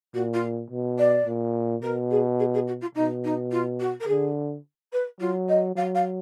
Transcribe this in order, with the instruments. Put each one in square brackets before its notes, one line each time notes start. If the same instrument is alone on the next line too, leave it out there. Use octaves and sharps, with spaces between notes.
[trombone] A#2 [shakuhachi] F#4
[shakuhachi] F4
[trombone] B2
[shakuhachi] D5
[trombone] A#2
[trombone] B2 [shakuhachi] A#4
[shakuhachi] G#4
G#4
G#4
F#4
F4
[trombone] B2 [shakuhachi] D#4
[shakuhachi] D#4
F4
F#4
A#4
[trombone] D3 [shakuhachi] G#4
[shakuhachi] B4
[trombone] F#3 [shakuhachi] F4
[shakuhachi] D#5
[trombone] F#3 [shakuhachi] F5
[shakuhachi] F5